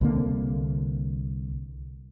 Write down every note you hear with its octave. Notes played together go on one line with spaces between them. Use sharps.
C2 D3 A#3